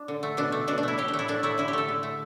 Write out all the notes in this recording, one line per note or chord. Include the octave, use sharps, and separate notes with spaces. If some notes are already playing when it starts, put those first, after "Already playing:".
Already playing: D4
D3
A3
B2 D4
A3
B2 D4
D4
A3 E4
A2 G4
D4
A3
E4
A2 D4
A3 E4
D3 E4
G4
A3 A4
D3
A3